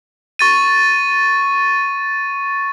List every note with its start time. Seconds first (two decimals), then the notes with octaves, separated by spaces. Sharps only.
0.39 C#6 A6 D#7